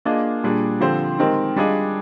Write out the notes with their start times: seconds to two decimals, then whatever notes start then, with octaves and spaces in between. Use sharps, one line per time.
0.05 A#3 D4 F4 G#4 D#5
0.44 A#2 G3 D4 G#4
0.81 D3 F3 C4 G4 C5
1.19 D#3 G#3 C4 G4 A#4
1.56 G3 D4 F4 G#4 D#5